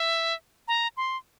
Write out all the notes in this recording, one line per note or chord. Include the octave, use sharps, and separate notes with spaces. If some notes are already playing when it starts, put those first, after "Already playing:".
Already playing: E5
A#5
C6